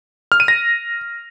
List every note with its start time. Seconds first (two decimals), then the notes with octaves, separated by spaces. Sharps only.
0.32 F6
0.40 D#7
0.48 A#6